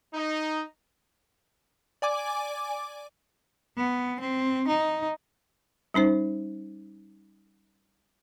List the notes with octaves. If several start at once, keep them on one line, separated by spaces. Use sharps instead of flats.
D#4
D5 G#5 D6
B3
C4
D#4
G3 C#4 D#4 C5